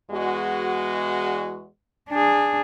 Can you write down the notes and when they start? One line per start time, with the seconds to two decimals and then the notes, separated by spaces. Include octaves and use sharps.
0.10 E2 G#3 F#4
2.10 D4 G#4